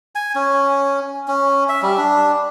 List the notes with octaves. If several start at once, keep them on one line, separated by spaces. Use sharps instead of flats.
G#5
C#4
C#4
E5
G3
D4